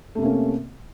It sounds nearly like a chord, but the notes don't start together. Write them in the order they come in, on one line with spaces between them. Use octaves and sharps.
A3 C3 A#3 C#4